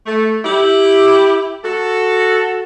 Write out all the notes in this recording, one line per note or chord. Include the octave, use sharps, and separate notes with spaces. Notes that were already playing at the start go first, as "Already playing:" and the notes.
A3
E4 G4
F#4 A4